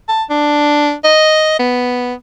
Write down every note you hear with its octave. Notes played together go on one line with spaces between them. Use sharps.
A5
D4
D#5
B3